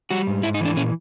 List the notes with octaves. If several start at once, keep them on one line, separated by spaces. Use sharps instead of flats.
G3 F#4
G#2
G#2 E4
D#4
E3 D4
A#2 C#4